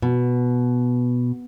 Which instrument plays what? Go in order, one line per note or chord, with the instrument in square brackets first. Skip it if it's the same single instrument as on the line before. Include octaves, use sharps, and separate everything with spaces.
[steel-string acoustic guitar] B2